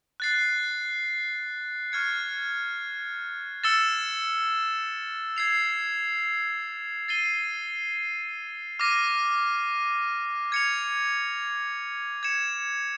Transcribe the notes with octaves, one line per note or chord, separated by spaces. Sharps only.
F#6 A6 C7
C#6 F6 G#6 C#7
E6 A6 C#7 E7 G7
G#6 C7 F7
A6 C7 D#7 G7
D6 F6 A#6 D#7
G#6 C#7 F7
G#6 C#7 E7